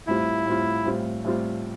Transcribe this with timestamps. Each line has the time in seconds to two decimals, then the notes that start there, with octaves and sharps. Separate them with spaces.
0.07 A2 G3 C4 E4 F4
0.46 A2 G3 C4 F4
0.85 A2 G3 C4 F4
1.24 A2 G3 C4 F4